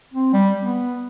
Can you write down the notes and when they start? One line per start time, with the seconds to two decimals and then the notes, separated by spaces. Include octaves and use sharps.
0.14 C4
0.33 G3
0.61 B3